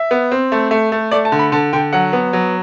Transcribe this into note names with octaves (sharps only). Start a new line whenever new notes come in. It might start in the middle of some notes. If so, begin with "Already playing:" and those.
Already playing: E5
B3
C4
A3
A3
A3
A3 D5
A5
D3
B5
D3 A5
D3 G5
F#3 F#5
B3
F#3